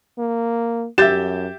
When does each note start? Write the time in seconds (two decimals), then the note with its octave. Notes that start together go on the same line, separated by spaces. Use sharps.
0.18 A#3
0.98 F#2 G4 E5 G6 A6 E7